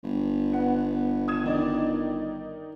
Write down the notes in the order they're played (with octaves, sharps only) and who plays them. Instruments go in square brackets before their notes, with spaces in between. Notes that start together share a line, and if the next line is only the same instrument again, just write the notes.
[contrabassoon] G1
[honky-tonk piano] B3 F#5
D#6 G#6 E7
D#3 D#4 D5